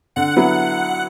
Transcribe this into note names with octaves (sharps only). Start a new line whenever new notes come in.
D3 F#5
F#3 B3 E4